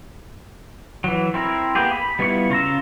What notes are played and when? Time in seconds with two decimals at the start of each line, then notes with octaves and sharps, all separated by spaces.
1.04 E3 F#3
1.34 C4 E4 A#4
1.75 A#3 B3 G4 G#4
1.93 B5
2.19 G3 B3 E4 F4 C#6
2.50 C#3 F4 A#5 E6